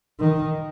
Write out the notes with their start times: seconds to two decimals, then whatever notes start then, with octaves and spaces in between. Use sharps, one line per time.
0.20 D#3